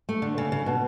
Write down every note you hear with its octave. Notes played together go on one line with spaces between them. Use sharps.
A3
D3
C#3
C#3
B2